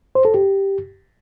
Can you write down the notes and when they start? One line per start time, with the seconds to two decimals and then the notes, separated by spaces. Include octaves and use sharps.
0.15 C5
0.25 A4
0.34 G4